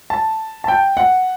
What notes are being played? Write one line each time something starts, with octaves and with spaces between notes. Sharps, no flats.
A5
A5
G5
F#5